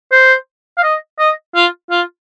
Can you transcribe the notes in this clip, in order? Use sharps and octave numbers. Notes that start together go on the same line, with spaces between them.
C5
F5
D#5
D#5
F4
F4